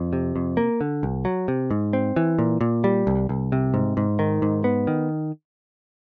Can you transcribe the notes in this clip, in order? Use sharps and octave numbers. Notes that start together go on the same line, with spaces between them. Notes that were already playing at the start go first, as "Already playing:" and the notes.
Already playing: F2
C3
F2
A#3
D3
C2
F#3
C3
G#2
C4
E3
A#2
A#2
G3
C2
C2
C3
G#2
G#2
D#3
G#2
B3
D#3